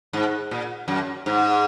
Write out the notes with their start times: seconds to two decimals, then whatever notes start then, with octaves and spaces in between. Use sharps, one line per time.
0.13 G#2
0.51 A#2
0.88 F#2
1.26 G#2